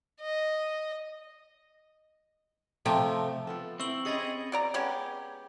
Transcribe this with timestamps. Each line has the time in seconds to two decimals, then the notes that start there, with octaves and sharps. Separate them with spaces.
0.21 D#5
2.86 C3 F3 A3 G4
3.47 F3 B3 A4
3.80 C4 E4 C#6 E6 F#7
4.05 C#4 G4 G#4 D#5 B5 A6 C#7
4.52 B2 D5 A#5
4.74 G#3 B3 C#4 G4